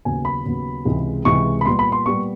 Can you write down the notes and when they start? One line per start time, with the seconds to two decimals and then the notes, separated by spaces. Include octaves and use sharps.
0.05 D#2 C#3 F#3 B3 G#5
0.25 B5
0.45 D#2 C#3 F#3 B3
0.85 C#2 C3 E3 G#3
1.25 C#2 C3 E3 G#3 C#6
1.61 B5
1.66 A#2 G3 B3 C6
1.79 B5
1.92 C6
2.06 A#2 G3 B3 C#6